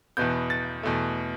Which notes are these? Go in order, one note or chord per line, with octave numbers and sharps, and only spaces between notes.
E2 B2 B3 G6
A6
E2 B2 A3